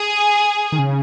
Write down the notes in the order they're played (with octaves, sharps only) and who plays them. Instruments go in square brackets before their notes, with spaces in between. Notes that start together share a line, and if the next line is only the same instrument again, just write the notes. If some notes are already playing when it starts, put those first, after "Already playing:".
Already playing: [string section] G#4
[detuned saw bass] D#3
C#3